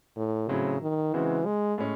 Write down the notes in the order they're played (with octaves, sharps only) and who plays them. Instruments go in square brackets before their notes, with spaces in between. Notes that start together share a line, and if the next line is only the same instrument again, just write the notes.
[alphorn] A2
[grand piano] A2 F#3 C4 E4 [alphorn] C#3
[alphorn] D#3
[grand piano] C#3 G#3 C4 F#4 [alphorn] E3
[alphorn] G#3
[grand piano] A2 G#3 C#4